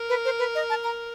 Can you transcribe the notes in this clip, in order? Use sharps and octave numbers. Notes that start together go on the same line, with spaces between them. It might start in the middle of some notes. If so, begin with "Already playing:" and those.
Already playing: A#4
B4
C5
B4
D#5
A5
A#5